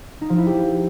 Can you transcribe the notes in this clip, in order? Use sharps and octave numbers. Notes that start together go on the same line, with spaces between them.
D#4
F3
E4
G4